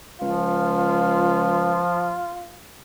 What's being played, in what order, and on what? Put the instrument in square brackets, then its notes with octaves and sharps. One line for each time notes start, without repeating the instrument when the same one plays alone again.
[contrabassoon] C#2 [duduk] F3 [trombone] F4